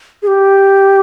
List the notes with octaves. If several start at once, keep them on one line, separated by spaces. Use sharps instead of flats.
G#4
G4